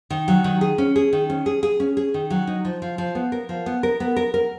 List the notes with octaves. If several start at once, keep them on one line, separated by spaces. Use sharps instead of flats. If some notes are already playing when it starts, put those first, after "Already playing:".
D#3
F#3
D#3
G#4
C#4
G#4
D#3
C#4
G#4
G#4
C#4
G#4
D#3
F#3
D#4
F3
F3
F3
B3
A#4
F3
B3
A#4
B3
A#4
A#4